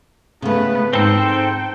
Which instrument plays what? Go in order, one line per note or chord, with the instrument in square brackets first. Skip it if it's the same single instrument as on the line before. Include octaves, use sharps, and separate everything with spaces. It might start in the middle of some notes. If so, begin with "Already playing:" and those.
[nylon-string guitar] C#3 A3 [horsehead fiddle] B3 B4
[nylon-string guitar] G#2 [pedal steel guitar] C4 A4 C5 [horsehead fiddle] G5